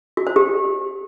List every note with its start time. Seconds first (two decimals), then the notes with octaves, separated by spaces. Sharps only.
0.17 F#4
0.27 C5
0.36 G4